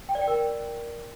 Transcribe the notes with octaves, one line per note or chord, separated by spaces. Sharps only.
G5
D5
G5
A#4